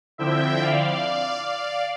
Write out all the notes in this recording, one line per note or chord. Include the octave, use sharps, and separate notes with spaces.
D3 F3 C4 E4 E5 G5
D5 F5
D5 F5